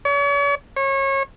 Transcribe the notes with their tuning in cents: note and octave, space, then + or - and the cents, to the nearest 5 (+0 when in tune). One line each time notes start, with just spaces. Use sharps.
C#5 +40
C#5 -30